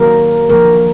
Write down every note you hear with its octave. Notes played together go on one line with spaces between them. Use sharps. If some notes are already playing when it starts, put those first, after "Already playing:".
Already playing: D#3 F#3 A#3 A#4
D3 F3 A#3 A#4